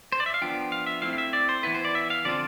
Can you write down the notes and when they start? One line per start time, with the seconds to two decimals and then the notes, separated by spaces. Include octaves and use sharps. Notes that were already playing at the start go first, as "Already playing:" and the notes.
0.12 C5
0.20 D5
0.26 E5
0.34 F5
0.42 F3 B3 D4 F4 G5
0.72 F5
0.87 E5
1.02 A3 C4 E4 F5
1.13 F5
1.18 E5
1.33 D5
1.49 C5
1.63 E3 B3 E4 B4
1.74 C5
1.85 D5
1.95 E5
2.10 F5
2.25 D3 F3 C4 F4 D5